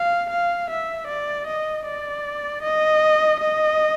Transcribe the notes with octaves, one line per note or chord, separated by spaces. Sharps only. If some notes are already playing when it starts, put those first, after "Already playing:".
Already playing: F5
F5
E5
D5
D#5
D5
D#5
D#5